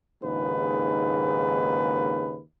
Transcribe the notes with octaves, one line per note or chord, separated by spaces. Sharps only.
A#1 D#2 G#2 C#3 B4